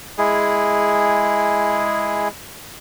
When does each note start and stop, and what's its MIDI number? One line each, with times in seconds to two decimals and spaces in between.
0.18 2.28 56
0.18 2.28 64
0.18 2.28 68